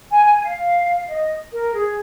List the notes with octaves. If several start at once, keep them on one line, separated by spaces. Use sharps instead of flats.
G#5
G#5
F5
D#5
A#4
G#4